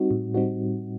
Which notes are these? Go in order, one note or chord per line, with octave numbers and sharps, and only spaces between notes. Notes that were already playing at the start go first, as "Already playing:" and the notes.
Already playing: G3 C4 D#4 F#4
A2
G3 C4 D#4 F#4